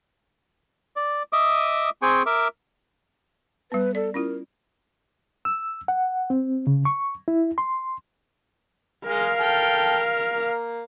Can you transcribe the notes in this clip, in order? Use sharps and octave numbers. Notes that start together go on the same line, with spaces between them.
D5
D#5 E5 D6 D#6
C4 G#4 G5 G#5 C#6
A#4 E5 D6
G3 B3 B4
A4 D5
C#4 E4 F4 A#4
E6
F#5
C4
C#3
C#6
E4
C6
G#3 A#4 F5
A4 G5
A#3